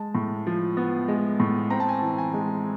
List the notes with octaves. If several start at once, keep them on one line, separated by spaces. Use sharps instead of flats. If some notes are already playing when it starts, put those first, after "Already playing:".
Already playing: G#3 A5
A2
F3
B3
G#3
A2
C4 A#5
A5
G#5
A5
E3
G#5
G#3